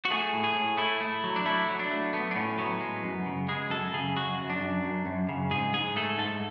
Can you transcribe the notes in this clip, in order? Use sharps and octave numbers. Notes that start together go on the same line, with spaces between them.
F#4
A3 G#4
A2
G#4
A2
A3 E4
A3
F#3
D4
A3 E4
F#3
D4
A3
A3 B3
D4
A2 C#4
F#3 B3
G#3
F#2
C#3
G#3 G#4
F#2 A4
C#3 G#4
F#2 F#4
F#2
D4
F#2
F#2
F#2
C#3
G#2 G#4
G#2 G#4
A3 A4
G#2 A4